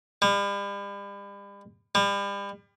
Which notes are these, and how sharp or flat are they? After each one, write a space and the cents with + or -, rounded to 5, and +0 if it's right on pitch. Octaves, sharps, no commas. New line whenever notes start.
G3 +40
G3 +35